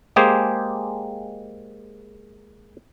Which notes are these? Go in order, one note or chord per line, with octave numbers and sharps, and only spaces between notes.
G#3 A#3 G4 G#4 C5